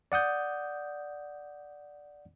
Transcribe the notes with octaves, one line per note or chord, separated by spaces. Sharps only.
D5 F#5 D#6 G6